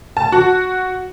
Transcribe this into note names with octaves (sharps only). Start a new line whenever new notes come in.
A5
F#4